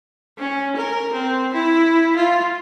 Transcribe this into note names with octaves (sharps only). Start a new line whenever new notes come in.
C#4
A#4
C4
E4
F4